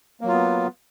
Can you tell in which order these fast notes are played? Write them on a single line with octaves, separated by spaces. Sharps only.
A#3 F#3 F4 B3